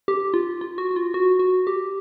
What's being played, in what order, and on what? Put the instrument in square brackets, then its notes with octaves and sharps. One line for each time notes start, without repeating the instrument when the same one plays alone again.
[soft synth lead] G4
F4
F4
F#4
F#4
F4
F#4
F#4
G4